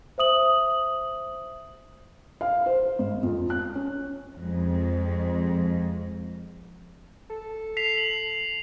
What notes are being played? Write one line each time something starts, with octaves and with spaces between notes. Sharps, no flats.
C5 E5 D#6 F#7
F5
C5
G#1
F2
F#6
C#4
F2 G#3
A4
B6 C7 F7
F#7